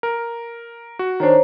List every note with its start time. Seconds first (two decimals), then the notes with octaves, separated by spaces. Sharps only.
0.03 A#4
0.99 F#4
1.20 D#3 D4 C5 C#5 A#5